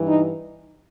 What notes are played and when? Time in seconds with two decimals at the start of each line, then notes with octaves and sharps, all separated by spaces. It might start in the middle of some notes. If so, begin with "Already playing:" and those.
Already playing: G2 E3
0.08 D#4